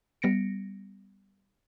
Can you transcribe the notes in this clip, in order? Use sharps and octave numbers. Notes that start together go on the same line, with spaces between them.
G3 B3 A#6 C#7 D7